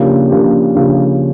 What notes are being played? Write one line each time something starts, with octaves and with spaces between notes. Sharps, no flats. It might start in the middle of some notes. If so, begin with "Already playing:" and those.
Already playing: C#3 F3 A#3 D4 G4
C#3 F3 A#3 D4 G4
C#3 F3 A#3 D4 G4